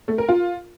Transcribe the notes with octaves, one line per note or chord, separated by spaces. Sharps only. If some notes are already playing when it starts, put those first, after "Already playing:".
A3
A#4
F4